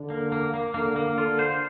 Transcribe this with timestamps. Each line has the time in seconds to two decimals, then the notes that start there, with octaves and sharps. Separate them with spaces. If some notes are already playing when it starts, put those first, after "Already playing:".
Already playing: D3
0.10 A#3
0.32 A#3
0.54 A#3
0.74 D3 A#3
0.96 A#3
1.17 D3 F4
1.39 C5